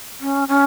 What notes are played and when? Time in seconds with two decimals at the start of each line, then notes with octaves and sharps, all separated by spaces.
0.20 C#4
0.48 C#4